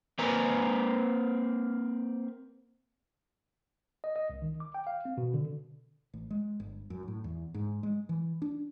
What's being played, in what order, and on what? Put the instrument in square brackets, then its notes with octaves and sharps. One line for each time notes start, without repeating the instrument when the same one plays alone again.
[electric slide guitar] A#3 C4 B4 G#5 A#5
[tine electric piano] D#5
D#5
C2
D#3
D6
G5
F5
C4
B2
D3
[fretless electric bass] A1
G#3
G1
F#2
A2
E2
G#2
G#3
E3
D4